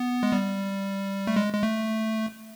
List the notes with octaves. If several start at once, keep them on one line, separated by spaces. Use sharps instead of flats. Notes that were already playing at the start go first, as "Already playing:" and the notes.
Already playing: B3
G#3
G3
A3
G#3
G#3
A3